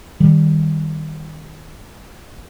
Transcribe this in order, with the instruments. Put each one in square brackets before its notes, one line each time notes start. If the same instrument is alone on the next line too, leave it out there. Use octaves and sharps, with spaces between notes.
[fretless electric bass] D#3 G3